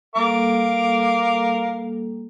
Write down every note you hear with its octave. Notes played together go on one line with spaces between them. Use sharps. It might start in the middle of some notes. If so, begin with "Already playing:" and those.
G3 A#3 A4 A#4 F5 D6